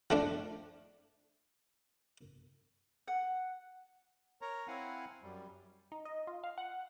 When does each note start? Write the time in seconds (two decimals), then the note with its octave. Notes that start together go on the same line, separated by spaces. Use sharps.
0.10 F3 A3 D4
3.08 F#5
4.42 A#4 C#5 A#5
4.68 C4 E4 F5 F#5 G#5
5.23 F#2 G3
5.92 D#4
6.05 D#5
6.27 F4
6.44 F5
6.58 F#5